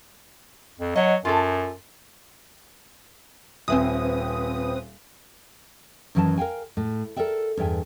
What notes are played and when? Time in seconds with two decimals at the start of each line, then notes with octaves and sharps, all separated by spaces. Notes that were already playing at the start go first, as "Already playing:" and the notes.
0.79 F2
0.96 F#3 D#5 F#5
1.25 F#2 F4 A4
3.68 D#1 C4 B4 E5 G#5 D#6
6.15 F#2 D#3 E3 F#3 G5 A5
6.38 A#4 F5 G5 G#5
6.77 A2
7.16 A4 A#4 D5 E5 G5
7.57 E2 G2 E5 G5 G#5